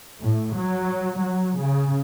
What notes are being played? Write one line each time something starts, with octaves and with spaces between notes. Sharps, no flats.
A2
F#3
F#3
C#3